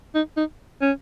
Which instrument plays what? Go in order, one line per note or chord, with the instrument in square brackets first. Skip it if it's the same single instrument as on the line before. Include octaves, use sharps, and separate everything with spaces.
[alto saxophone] D#4
D#4
C#4